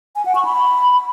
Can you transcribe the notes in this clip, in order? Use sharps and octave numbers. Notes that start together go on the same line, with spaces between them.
G#5
F#5
C#6
B5